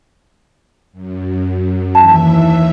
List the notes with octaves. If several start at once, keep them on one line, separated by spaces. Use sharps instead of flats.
F#2
D#2 E3 E5 A5